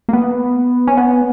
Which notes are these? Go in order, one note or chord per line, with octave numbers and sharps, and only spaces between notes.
A#3
B3
C#4
B3